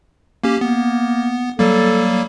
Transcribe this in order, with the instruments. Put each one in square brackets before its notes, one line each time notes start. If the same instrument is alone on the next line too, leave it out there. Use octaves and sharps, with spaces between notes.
[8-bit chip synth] A#3 C#4 G4
[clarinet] A#3 [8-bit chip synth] B3
[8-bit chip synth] F#3 G3 A#3 [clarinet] A4